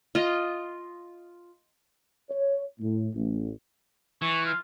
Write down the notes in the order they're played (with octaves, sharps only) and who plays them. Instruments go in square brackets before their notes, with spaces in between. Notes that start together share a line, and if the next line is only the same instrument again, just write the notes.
[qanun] F4 D#5
[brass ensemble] C#5
A2
A1
[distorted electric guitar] E3 [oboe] C#6
[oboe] F4